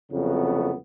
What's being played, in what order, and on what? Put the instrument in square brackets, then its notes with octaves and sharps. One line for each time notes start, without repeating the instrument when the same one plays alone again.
[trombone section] C2 F2 C#3 F#3 A3 B3